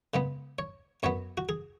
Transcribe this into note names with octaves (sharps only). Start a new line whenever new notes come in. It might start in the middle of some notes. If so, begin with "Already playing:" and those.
C#3 G#3 B3
C#5
F#2 F#3 B3 C#5
F#4
G#4